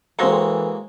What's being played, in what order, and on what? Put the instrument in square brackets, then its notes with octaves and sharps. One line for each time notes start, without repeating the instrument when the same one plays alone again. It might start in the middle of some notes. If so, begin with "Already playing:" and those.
[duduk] E3 [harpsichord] G#3 A#3 F#4 [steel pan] C4 C5 A#5 [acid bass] A4